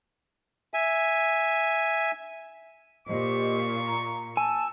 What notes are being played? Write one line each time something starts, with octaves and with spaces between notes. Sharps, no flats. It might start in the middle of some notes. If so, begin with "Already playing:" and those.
E5 G#5
A#2 G4 C5 D#5 C#6
A#5
G#5 A5 E6